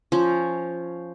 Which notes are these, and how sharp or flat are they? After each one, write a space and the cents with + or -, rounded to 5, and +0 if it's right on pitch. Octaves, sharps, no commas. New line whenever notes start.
F3 -5 C#4 +0